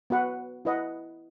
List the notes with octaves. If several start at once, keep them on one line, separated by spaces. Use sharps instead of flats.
B3 F#4 B4 F#5
E4 B4 D#5 F#5